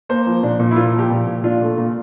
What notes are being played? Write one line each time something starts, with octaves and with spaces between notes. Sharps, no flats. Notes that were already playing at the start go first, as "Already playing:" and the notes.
A#3 C5
F3
A#2 D4
A#2
E4
A#3 F4
F3
G4
A#2
A#2
D4 F4
A3
A#2